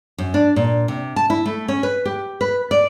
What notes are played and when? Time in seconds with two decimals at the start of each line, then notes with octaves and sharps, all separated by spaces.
0.18 F#2
0.34 D4
0.56 A#2
0.88 C3
1.16 A5
1.30 E4
1.46 A3
1.68 C#4
1.83 B4
2.05 G4
2.41 B4
2.71 D5